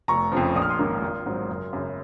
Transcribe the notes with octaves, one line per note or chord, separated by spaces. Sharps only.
F1 A#5 C#6
F2 C#3 F3
A#1 D#6
F6
C6 D#6
G#2 D#3 A#3 C#4
G#1
G#2 F#3 C4
F#1
F#2 C#3